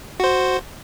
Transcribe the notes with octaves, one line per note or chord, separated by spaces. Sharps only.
F#4 C5